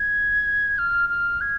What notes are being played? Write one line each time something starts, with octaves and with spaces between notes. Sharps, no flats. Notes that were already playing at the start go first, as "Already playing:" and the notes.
Already playing: G#6
F6
F6
G#6